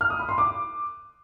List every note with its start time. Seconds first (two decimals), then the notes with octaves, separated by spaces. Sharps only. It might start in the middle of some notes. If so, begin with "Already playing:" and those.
0.01 F6
0.10 D#6
0.19 B5
0.29 C6
0.38 D6